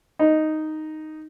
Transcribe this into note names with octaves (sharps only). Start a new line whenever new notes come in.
D#4